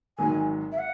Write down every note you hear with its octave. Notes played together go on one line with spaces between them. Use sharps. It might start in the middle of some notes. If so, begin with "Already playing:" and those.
G#1 G#2 D#3 F#3 G#5
E5
F#5